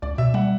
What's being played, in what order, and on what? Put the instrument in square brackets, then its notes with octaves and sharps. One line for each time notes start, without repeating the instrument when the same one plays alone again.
[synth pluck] C#2 [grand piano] D5
[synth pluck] B2 [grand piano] E5
[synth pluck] G3 [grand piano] F#5